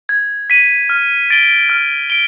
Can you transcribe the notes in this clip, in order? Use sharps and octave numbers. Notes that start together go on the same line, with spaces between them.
G#6
B6 D#7
F6
A6 D7 G7
F6
D7 G7